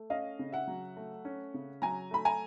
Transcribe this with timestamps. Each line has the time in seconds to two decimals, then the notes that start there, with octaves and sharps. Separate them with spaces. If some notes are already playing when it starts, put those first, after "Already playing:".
Already playing: A3
0.10 C#4 D#5 F5
0.39 C#3
0.52 E5 F#5
0.67 F#3
0.97 A3
1.25 C#4
1.54 C#3
1.82 F#3 G#5 A#5
2.11 A3 B5
2.25 G#5 A#5